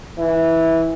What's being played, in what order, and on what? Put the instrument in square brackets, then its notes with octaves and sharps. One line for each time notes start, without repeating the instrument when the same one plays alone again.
[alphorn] E3